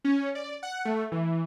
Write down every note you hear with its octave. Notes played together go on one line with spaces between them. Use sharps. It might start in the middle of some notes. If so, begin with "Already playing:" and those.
C#4
D5
F#5
A3
E3